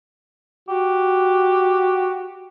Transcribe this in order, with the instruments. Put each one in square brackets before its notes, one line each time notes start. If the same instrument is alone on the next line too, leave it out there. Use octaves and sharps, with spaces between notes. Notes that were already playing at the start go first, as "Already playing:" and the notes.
[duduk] F#4 [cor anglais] G4